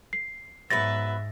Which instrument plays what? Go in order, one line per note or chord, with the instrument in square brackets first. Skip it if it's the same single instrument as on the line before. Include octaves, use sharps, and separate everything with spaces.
[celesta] C7
[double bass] G#2 [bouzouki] F#3 B3 B4 [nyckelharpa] E5 [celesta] A6 A#6